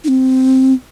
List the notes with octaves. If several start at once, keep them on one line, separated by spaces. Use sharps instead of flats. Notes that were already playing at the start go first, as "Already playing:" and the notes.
D#4
C4